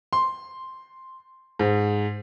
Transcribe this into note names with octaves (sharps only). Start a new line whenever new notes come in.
C6
G#2